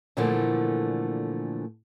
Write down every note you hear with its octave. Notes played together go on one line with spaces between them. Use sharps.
A#2 D3 E3 F3 A3 A#3